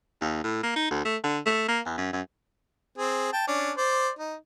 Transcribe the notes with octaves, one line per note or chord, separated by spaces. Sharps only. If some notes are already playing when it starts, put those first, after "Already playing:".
D#2
A2
A#3
D#4
D2
A3
D3
A3
A#3
E2
F#2
F#2
C4 G#4
G5 A5
C#4 D4
C5 D5
D#4